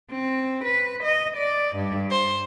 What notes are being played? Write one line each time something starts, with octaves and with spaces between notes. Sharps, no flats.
C4
B4
D#5
D5
G2
C5